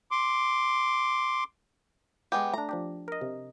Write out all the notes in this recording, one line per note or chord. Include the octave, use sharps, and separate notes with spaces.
C6 D6
G#3 B3 G4
A3 D4 A#5
F3 D4 G4
A#4 D#5
C3